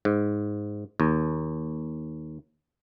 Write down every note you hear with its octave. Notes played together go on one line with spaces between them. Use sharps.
G#2
D#2